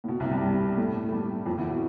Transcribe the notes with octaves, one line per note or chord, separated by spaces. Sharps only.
A2
B2
C2 C3
G2 G3
G2 G3
A2 A3
A3
G2 G3
F2 F3
E2 E3
B2